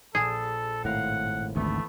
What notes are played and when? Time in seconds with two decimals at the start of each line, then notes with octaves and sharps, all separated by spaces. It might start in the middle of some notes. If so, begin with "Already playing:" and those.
0.15 A#1 G#4 A4 E7
0.85 G#1 A2 A#4 F5 F#5 C6
1.56 G#1 D2 E3 A3 B3